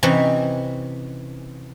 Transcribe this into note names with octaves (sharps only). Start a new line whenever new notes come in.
C3 E3 C#4 D#4 B4